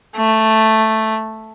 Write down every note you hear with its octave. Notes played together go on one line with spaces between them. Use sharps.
A3